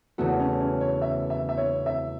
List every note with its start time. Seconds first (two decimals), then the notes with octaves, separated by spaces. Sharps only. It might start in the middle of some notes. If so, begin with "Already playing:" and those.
0.18 E2 C#3 A3 B3 F#4
0.40 C#4
0.61 C#4
0.81 C#5
1.01 E5
1.30 E5
1.49 E5
1.57 C#5
1.86 E5